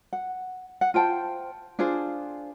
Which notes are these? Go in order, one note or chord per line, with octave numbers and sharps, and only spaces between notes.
F#5
F#5
F4 C5 G5 A5
D4 F4 G#4 C5